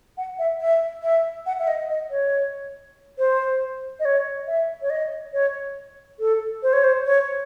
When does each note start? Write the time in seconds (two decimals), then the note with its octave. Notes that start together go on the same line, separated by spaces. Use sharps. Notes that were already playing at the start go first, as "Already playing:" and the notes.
0.18 F#5
0.39 E5
0.61 E5
1.03 E5
1.46 F#5
1.59 E5
1.68 D#5
1.90 D#5
2.11 C#5
3.18 C5
4.00 D#5
4.05 C#5
4.47 E5
4.82 C#5
4.90 D#5
5.33 C#5
6.20 A4
6.63 C5
6.73 C#5
6.84 C5
7.06 C#5